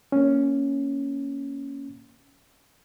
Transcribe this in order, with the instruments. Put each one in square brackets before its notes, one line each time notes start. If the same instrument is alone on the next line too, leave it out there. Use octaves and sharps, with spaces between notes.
[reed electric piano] A#3 C#4